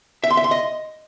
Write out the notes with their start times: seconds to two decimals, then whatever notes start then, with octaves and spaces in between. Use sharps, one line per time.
0.24 E5
0.30 C6
0.37 E5
0.44 C6
0.51 D#5